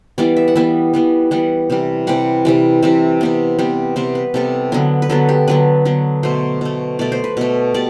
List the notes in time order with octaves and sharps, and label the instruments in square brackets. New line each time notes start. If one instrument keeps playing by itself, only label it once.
[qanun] E3 G3 B3 D5
E5
F#5
E3 G3 B3 E5
E3 G3 B3
E3 G3 B3 F#5
C3 E3 G3
C3 E3 G3 F#5
C3 E3 G3
C3 E3 G3 E5
C3 G3 B3
C3 G3 B3
C3 G3 B3 C5
B4
C3 G3 B3 A4
D3 F#3 B3
B4
D3 F#3 B3 A4
G4
D3 F#3 B3 B4
D3 F#3 B3
B2 A3 C5
B2 A3
B2 A3 D5
C5
B4
B2 A3
B2 G3 D5